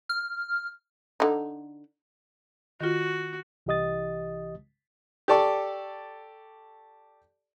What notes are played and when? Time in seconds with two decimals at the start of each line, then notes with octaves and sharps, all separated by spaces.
0.09 F6
1.20 D3 D#4
2.81 D#3 F4 F#4
3.66 C2 E3 G4 D#5 D#6 A6
5.28 G4 A4 D5 A5 C#6